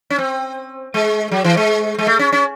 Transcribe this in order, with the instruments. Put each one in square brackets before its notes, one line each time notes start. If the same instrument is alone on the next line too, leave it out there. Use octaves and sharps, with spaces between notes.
[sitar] C#4
C4
G#3
F#3
E3
G#3
G#3
A3
C#4
C#4